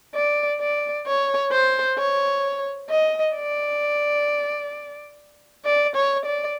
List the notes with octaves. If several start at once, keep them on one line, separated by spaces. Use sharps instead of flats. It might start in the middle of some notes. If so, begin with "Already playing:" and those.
D5
D5
C#5
C5
C#5
D#5
D5
D5
C#5
D5